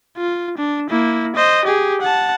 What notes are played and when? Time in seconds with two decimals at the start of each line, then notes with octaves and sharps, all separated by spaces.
0.17 F4
0.58 D4
0.90 A#3 E4
1.36 C5 D#5
1.65 G4 G#4
2.01 F#5 A5